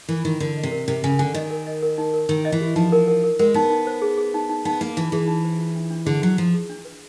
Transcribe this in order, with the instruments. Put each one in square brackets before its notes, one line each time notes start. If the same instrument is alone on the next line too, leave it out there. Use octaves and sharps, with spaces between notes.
[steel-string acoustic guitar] E3 [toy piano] A#4
[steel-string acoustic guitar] D#3 [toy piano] A#4
[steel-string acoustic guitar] D3 [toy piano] A#4
[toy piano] D#5
[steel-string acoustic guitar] C3
[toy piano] A#4
[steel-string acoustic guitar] C3 [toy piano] A#4
[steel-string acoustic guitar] C#3 [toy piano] G#5
[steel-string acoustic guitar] D3 [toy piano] G#5
[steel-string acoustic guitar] D#3 [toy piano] D#5
[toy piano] A#4
D#5
A#4
D#4
A#4
[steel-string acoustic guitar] D#3 [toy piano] A#4
[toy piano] D#5
[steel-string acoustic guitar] E3
[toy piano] G4
[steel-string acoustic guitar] F3 [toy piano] D#4
[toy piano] A#4
A#4
A#4
[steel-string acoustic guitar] G#3 [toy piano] A#4
[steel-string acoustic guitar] B3 [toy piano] D#4
[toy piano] D#4
C5
G#4
G#4
D#4
D#4
[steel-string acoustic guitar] B3 [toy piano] D#4
[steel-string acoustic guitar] A#3 [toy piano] D#4
[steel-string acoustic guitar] E3 [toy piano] D#4
[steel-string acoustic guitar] E3 [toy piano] G#4
[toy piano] D#4
C5
F4
D4
D4
[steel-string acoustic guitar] D3 [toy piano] G#4
[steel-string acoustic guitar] F#3 [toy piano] D4
[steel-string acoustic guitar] F3 [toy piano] F4
[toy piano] G#4
D4
B4